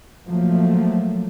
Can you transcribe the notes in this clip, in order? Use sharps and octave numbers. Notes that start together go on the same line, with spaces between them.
F3 F#3 A3 A#3